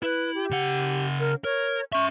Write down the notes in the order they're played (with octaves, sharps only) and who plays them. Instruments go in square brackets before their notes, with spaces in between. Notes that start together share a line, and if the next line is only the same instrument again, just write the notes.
[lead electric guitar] E4 [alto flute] B4
[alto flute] G4
[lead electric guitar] C#3 F#5
[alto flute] A#4
[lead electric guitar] A#4 [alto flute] C#5
[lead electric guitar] C#4 E5 [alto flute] C#6